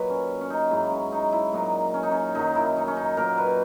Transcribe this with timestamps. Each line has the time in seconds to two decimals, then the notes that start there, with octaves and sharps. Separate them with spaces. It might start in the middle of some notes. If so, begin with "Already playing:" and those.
Already playing: A#2 F#3 B4 C#5 D#5
0.10 C#4
0.41 C#4
0.50 D#4
0.71 G#2 F#3 E4
0.92 C#4
1.12 D#4
1.32 E4
1.53 A#2 F#3 D#4
1.94 C#4
2.03 D#4
2.11 C#4
2.35 F#2 D#3 F#3 D#4
2.55 E4
2.76 D#4
2.88 C#4
2.97 D#4
3.17 A#2 F#3 A#4
3.38 B4